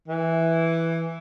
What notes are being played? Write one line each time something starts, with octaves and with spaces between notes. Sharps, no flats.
E3